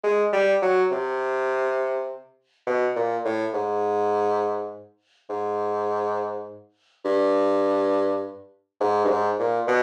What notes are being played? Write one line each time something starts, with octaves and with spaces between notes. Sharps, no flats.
G#3
G3
F#3
C3
B2
A#2
A2
G#2
G#2
G2
G#2
G2
G#2
A#2
B2